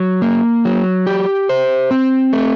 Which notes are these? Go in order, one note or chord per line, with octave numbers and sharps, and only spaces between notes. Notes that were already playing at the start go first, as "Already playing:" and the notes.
Already playing: F#3
A#3
F#3
G4
C5
C4
A3